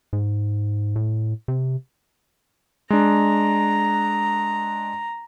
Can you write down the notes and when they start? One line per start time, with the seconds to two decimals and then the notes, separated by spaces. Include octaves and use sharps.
0.13 G#2
0.96 A2
1.48 C3
2.90 G#3 D4 A#5